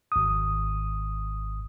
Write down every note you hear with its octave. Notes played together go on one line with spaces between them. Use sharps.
G#1 D#6